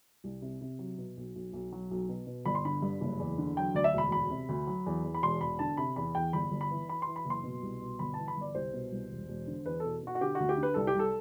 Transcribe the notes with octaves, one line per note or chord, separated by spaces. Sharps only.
C2
C3
C3
F#3
B2
B1
B1
B1
F#3
B1
B2
B2
G1 B5
C6
D3 B5
G2
F#1
E2
D3
F#3 G5
D2 D5
E5
E1 B5
D2 B5
C3
D2
F#3
E2
E2
B5
E1 C6
E1 B5
D3 A5
C3 B5
E2 B5
E2 G5
G1 B5
G1
B5
E3
E3 B5
C6
E3
B5
F#1 C6
B2
C2
B2
G1 B5
E3 A5
B5
G1 D5
C2 C5
B2
C2
E1
E1
D3
E2 B4
B2 A4
B2 F#4
F#4
D3 G4
F#4
D2
G4
D3
B4
C2 A4
G4
C2 A4